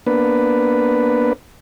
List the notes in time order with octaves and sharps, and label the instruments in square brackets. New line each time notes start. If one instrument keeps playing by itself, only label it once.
[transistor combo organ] A#3 B3 D4 B4